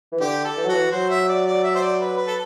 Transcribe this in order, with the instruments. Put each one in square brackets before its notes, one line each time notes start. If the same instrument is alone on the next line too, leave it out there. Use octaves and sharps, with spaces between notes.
[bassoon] E3
[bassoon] D3 [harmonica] G4
[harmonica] A4
[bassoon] E3
F#3
[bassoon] E3 [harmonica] F#4
[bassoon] F#3 [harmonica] C5
[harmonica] E5
D5
D5
E5
C5
D5
B4
B4
A4